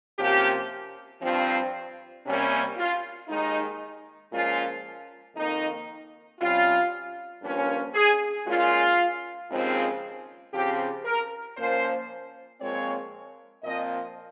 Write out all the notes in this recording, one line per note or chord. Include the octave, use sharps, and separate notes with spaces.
C3 F3 A#3 C#4 G4
G2 F3 C4
C3 G3 A#3 C#4
F4
D#2 D#3 G#3 D#4
A#2 F3 G#3 C#4 F4
F2 D#3 A#3 D#4
C3 G3 C#4 F4
G2 F3 A#3 C#4
G#4
A#2 G#3 C#4 F4
D#2 C#3 F3 G#3 C4
C#3 F3 C4 G4
A#4
A#2 F3 A#3 C#4 C5
A#2 F3 G#3 C4 C#5
A#2 F3 C4 D#5